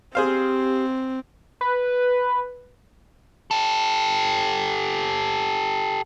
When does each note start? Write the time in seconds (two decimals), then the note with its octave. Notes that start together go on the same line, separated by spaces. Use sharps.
0.15 C4 G4 G#4 C5 F5
1.61 B4
3.51 G4 A4